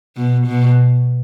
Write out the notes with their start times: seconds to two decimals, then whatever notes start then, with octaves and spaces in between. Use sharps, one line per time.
0.17 B2
0.46 B2